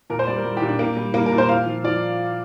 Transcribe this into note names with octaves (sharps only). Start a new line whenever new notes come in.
A#2 A#4
C5
G3 D5
A#4
G3
G4
A#2
D4
A#2 A#3
G3
G3 A#3
A#4
A#2
C5
A#2 F5
F3
F3 D5